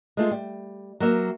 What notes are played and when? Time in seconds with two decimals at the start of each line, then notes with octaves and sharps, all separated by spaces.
0.17 G#3 A3 F4
0.31 G3
1.00 F#3 A#3 E5